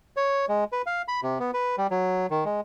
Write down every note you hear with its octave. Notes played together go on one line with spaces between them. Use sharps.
C#5
G#3
B4
F5
B5
C3
B3
B4
G3
F#3
D#3
G#3